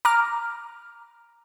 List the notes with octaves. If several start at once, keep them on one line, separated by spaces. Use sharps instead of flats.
A#5 D6 F6